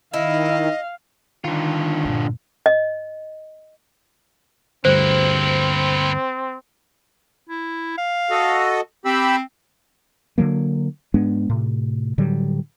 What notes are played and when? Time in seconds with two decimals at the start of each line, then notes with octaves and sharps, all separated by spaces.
0.14 D#3 E4 D#5 F5
1.44 D3 D#3 F4
2.04 G2 A#2
2.66 D#5
4.85 D2 G2 A#3 C4 E4 C5
7.49 E4
7.98 F5
8.31 F#4 A4 D#5
9.05 C4 G4 B5 E6
10.38 D3 D#3 F#3 A#3
11.14 G#2 G#3 B3 D4
11.50 A2 C3
12.18 A2 D3 F#3 G3